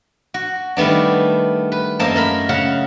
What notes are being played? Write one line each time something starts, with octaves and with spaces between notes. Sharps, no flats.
F#4
D#3 G3 A3 B3 D4
B4
F#2 A#3 A4 C5 D#5 A5
A3 A#4 B5
C#3 F5 F#5